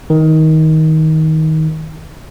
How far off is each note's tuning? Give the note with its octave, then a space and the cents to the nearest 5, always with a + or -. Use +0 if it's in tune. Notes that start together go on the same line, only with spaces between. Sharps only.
D#3 +20